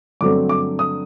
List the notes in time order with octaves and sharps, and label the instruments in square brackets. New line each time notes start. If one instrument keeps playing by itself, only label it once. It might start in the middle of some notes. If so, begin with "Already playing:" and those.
[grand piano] G2 D3 F#3 A3 C4 D6
D6
D#6